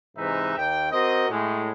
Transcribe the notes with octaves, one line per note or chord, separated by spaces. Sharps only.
G#2 C3 E3 D#4 B4 E5
D#2 G5
C4 F#4 A#4 D#5
A2 G#3